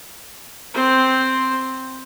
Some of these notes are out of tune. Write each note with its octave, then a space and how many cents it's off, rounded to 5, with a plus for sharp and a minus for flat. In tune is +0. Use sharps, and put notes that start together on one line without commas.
C4 +0 C5 +0